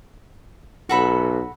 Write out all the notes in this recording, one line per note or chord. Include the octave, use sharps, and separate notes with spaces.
B1 F#4 A4 B5